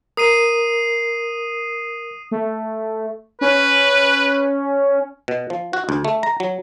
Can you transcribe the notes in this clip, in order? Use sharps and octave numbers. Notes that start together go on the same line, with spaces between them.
A#4 D#6 C7 D#7
A3
C#4 B4
B2
F3
F#4
D2
A3
A#5
F#3